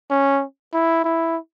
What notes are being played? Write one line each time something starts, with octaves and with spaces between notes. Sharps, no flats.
C#4
E4
E4